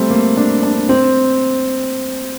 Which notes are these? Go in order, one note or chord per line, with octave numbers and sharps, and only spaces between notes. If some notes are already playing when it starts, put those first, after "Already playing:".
Already playing: G3 A3 C4
A#3
D4
D4
C4